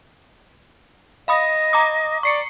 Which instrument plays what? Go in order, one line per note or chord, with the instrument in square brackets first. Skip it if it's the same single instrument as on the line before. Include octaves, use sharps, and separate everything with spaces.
[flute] D#5 [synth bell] F5 B5 D#6
[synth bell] A#5 D6 D#6
[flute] D5 [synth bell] C#6 C7 C#7